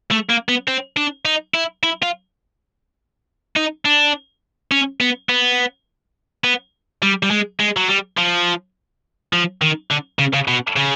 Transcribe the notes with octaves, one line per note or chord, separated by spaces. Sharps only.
A3
A#3
B3
C4
D4
D#4
E4
E4
F4
D#4
D4
C#4
B3
B3
B3
G3
G3
G#3
G#3
F#3
G3
F3
F3
D#3
D3
C#3
C#3
B2
C#3